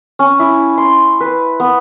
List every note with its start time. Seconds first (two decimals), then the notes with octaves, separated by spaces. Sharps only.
0.19 C#4
0.39 E4
0.78 C6
1.20 B4
1.60 B3